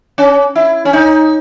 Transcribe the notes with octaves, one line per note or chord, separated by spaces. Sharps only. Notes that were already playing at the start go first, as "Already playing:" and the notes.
C#4
E4
C#4
D#4